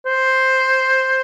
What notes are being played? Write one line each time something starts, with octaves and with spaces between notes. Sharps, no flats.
C5